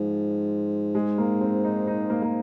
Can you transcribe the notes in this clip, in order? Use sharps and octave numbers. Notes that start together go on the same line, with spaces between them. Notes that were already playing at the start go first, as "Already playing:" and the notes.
Already playing: G#2 F3
G#3
A#3
C4
D#4
D#4
A#3
A#3